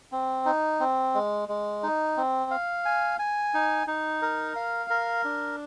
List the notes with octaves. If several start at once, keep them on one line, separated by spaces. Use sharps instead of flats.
C4
D#4
C4
G#3
G#3
D#4
C4
F5
G#5
G#5
D#4
D#4
A#4
F5
A#4
D4